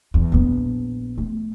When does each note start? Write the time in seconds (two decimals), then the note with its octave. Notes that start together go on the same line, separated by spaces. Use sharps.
0.14 E2
0.32 A#1 B3
1.18 A3